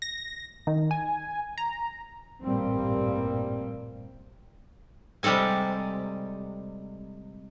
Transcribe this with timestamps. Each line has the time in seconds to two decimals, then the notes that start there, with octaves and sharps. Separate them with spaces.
0.02 A#6
0.67 D#3
0.91 G#5
1.58 A#5
2.42 A1 G2 A#2 G3 A#3 C4
5.23 C3 G3 G#3 A4 G#5